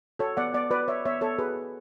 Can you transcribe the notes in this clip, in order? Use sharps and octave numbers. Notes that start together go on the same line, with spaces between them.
F#4 A4 C#5
B3 D5 F#5
B3 D5 F#5
F#4 B4 D5
F#4 C#5 E5
B3 C#5 E5
B3 A4 C#5
F#4 G#4 B4
B3